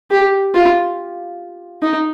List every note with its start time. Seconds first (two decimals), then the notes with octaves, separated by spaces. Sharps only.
0.11 G4
0.54 F4
1.82 D#4